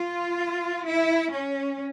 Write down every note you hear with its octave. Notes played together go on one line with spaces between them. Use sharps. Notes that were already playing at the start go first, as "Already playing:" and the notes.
Already playing: F4
E4
C#4